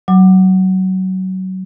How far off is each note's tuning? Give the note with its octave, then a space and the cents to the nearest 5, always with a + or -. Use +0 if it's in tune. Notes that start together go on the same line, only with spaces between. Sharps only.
F#3 +20 D6 +20